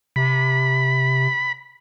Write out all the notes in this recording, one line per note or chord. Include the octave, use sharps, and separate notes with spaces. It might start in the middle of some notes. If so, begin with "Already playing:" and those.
C3 B5